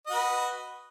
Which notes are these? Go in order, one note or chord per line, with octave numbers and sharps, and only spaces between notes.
F#4 B4 D#5